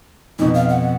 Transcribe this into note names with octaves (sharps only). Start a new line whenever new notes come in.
F2 B2 D#4
F5
F#5